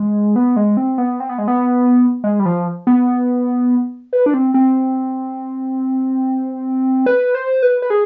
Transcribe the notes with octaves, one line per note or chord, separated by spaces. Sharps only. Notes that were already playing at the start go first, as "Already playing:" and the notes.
Already playing: G#3
B3
G#3
C4
B3
C4
B3
G#3
B3
G#3
G3
F3
B3
B4
D4
C4
C4
B4
C5
B4
B4
G#4